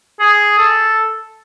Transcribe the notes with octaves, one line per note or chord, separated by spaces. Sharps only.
G#4
A4